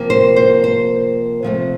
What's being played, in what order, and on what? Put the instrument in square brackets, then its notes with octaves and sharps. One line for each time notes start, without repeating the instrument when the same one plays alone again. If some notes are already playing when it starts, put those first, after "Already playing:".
Already playing: [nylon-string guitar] C3 F3 A#3
C5
C5
C5
C3 F3 A3 C4